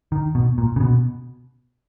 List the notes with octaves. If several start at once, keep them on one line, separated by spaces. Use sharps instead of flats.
D#3
B2
A#2
C#3
B2